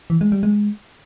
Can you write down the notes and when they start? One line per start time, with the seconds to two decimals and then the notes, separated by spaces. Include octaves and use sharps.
0.10 E3
0.21 G#3
0.32 G3
0.43 G#3